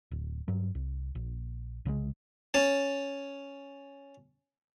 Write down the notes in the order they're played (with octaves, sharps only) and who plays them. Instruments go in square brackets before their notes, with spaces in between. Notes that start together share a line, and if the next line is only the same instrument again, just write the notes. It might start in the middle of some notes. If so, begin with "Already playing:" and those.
[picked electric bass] D1
G2 F#3
C2
A#1
C2 C#3 E3 G#3
[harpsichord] C#4 A5